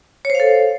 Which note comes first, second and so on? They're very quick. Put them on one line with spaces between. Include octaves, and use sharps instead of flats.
C#5 C5 F5 A4